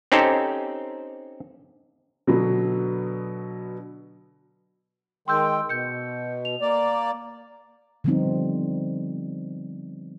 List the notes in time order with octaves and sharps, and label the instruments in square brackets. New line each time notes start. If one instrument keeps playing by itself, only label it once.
[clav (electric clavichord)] C4 C#4 D#4 G4 A4 C5
[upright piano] B2 D3 F#3 B3
[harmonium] D#3 G#3 G5 [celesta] C6 E6 G6
[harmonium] B2 [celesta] G6 C#7
[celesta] F7
[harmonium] A#3 D5
[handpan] D3 F3 G3 B3 C4 D#4